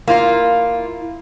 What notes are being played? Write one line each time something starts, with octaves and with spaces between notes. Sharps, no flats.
A#3 E4 F4 F5